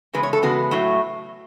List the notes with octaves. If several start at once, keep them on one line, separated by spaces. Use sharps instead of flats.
E2 C#3 G#3 B3 B4
C#5
A4
E2 C#3 G#3 B3 F#4
A2 F#3 A3